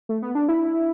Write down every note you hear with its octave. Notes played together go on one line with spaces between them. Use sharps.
A3
B3
D4
E4